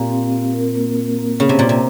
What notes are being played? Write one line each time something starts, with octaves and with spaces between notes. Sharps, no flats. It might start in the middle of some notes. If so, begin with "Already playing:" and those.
Already playing: A#2 C4 G4 F5
C4
C4
A#4
A#3
A#3
A#3
C#3 A#3
C3
A#2 G4
C3